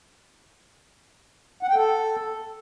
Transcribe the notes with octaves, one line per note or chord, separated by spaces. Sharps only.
F#5
G5
A4